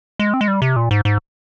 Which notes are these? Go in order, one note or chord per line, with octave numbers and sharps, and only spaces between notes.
G#3
C4
G#3
G3
C3
A#2
G#2
G#2